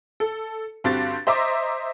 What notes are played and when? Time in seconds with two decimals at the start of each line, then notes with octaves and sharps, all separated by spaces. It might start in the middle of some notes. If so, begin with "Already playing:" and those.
0.20 A4
0.84 G2 D3 C4 F#4 G4 A6
1.27 C5 D#5 E5 A#5 D6